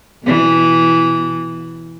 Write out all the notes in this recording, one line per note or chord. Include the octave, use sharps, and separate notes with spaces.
B2 E3